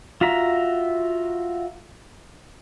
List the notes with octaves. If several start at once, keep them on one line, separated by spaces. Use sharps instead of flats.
F4 F#4 E5 A#5